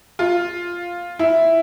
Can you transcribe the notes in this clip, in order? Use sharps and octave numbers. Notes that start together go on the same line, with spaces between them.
F4
E4